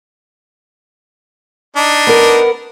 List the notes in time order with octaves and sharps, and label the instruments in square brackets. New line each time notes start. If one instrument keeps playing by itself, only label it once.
[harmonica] D4 D#4
[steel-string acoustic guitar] B3 A#4